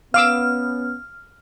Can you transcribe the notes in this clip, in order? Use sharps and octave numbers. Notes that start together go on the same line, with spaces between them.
B3 C#4 F5 D6 E6 F6